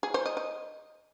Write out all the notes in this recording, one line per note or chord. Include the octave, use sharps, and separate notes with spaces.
G#4
C5
D#5
D#5